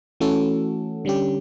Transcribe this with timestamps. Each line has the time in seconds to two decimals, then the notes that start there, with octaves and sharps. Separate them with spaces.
0.20 E3 A3 C#4 F#4 A4
1.05 D3 G3 C#4 G4